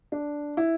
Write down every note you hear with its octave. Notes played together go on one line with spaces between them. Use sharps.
D4
E4